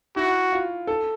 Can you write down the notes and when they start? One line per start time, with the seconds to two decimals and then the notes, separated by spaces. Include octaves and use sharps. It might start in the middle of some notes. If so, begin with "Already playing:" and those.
0.16 E4 F#4
0.52 F4
0.87 A4